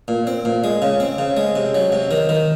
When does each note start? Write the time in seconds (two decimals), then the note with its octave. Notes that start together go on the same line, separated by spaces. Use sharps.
0.08 A#2
0.27 C4
0.45 A#2
0.64 G#3
0.82 C#3
1.00 C4
1.18 C#3
1.37 G#3
1.56 C3
1.75 F#3
1.92 C3
2.11 D#3
2.29 D#3